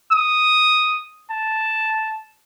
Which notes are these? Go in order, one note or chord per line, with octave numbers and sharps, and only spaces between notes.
D#6
A5